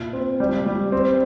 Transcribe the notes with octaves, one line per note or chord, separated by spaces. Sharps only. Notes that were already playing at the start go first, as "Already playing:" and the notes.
Already playing: A#2
C4
G3
G3
C4